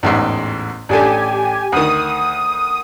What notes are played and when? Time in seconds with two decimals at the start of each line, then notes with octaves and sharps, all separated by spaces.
0.03 A1 E2 G#2
0.89 A1 D4 G4 A4 G#5
1.72 D2 D#3 D#6